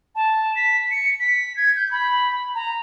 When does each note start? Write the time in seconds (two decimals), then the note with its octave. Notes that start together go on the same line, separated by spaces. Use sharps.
0.15 A5
0.56 B6
0.91 C#7
1.20 B6
1.57 G#6
1.76 G6
1.91 B5
2.55 A#5